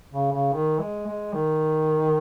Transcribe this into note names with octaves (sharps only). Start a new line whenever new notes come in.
C#3
C#3
D#3
G#3
G#3
D#3